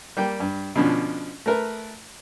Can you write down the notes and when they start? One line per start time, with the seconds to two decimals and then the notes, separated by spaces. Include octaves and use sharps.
0.17 G3 A#3 G5
0.40 G2
0.76 B2 D3 F3 C#4 D4
1.46 A3 A#4 B4